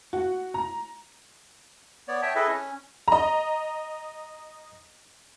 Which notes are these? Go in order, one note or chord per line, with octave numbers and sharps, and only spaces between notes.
F#4
A#5
B3 C#5 D5
C#5 E5 G5 A5
E4 G#4 A4 B4 D#5 E5
C#4
D#5 A#5